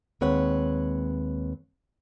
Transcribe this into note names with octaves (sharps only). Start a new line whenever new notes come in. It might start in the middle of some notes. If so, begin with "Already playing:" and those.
D#2 G#3 C4 B4 C#5 F#5